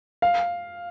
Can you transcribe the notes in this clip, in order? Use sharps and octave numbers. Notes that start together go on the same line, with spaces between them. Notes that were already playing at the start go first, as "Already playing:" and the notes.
F5